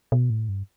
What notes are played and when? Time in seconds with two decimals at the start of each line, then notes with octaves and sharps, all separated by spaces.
0.12 B2
0.30 A2
0.49 G2